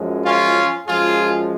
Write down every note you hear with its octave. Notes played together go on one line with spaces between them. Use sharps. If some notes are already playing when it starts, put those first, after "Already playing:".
Already playing: F#2 F3 G#3
C#4 F4
F#2 F3 G#3 F4 G#4